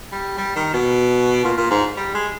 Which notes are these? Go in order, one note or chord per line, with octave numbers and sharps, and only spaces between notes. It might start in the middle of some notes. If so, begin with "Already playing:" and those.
G3
G3
D#3
B2
A#2
A#2
G#2
G3
G#3